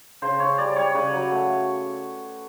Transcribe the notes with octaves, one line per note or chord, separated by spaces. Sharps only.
C#3 C5
C#3 C#5
G3 D5
G3 C#5
C#3 B4
F#3
A3